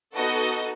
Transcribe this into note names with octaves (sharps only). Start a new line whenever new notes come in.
B3 D#4 F#4 A4 D#5